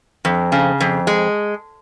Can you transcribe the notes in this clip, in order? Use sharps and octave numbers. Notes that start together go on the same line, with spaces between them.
F2
C#3
F2
G#3